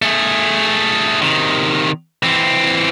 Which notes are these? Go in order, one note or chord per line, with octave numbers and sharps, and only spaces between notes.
A3 G#4
C3 D#3
E3 C4